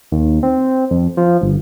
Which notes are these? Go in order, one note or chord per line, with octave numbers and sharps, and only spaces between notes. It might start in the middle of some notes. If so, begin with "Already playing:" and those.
D#2
C4
F2
F3
G1